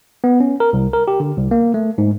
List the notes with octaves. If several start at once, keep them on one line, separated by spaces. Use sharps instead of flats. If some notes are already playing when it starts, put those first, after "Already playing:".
B3
C#4
A#4
C2
A#4
G4
D3
C2
A#3
A3
G#2